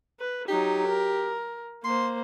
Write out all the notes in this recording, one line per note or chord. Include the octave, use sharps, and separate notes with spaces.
B4
F#3 D#4 G4
A#4
A#3 C5 C6